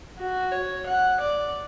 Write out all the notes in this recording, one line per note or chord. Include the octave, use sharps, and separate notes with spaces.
F#4
C#5
F#5
D5